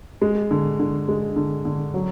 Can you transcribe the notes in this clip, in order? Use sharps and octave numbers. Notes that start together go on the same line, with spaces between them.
G#3
D3
D3
G#3
D3
D3
F#3